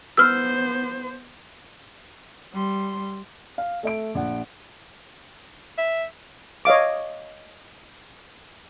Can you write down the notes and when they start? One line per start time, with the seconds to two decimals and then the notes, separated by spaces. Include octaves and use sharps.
0.17 B3 C5 E6 F6
2.51 G3 C6
3.58 F5
3.83 A3 E5 D7
4.15 A#1 F#5
5.78 E5
6.65 C#5 D#5 F5 D6